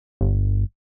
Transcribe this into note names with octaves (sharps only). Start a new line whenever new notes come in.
G1